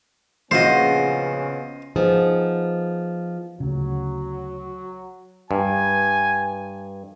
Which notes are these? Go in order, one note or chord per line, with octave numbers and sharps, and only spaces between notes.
A#1 C#3 B3 C#4 F4 F#4 C5 D#5
F3 B3 D#4 G#4
D2 C#3 F#3
G2 G#5